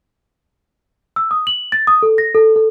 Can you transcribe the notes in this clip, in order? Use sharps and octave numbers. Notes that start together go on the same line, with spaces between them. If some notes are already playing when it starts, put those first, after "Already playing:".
E6
D#6
F#7
A6
D#6
A4
A#6
A4
A4